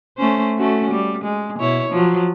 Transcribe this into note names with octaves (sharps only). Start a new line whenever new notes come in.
A3 C#4 C5
A3 C#4 F#4
G3
G#3
B2 E4 C#5
F3 F#3